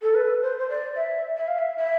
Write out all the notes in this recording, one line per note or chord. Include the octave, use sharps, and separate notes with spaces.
A4
B4
C5
C5
D5
E5
E5
F5
E5
E5